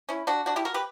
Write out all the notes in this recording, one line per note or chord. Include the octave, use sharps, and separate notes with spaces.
C#4 E4
D4 F#4
D4 F#4
E4 G4
F#4 A#4
G4 B4